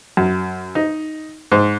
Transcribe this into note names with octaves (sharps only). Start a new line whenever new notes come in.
F#2
D#4
G#2